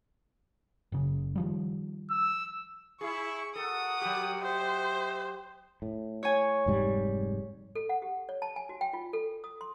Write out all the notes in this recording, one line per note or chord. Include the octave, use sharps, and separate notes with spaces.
F#1 C#3
D#3 F3 G3
E6
E4 G#4 C#6
F#4 A4 A#4 F#5 D#6
F#3 G4
C5 D#5 E5 F#5
A2
C#5 G#5
F1 G#2 G3
A4
F#5
G4
C#5
A5
G#5
F#4
G5
F4
A4
D#6
C6